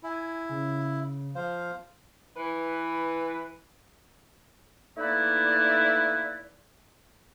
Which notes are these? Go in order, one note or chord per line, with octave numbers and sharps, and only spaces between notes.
E4 G#5
C#3
F3 C5 F5
E3 B4
A3 A#3 D#4 E4 B4 D5